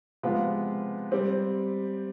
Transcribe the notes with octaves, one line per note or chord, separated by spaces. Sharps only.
C3 F3 G#3 B3 F4
G3 C4 G4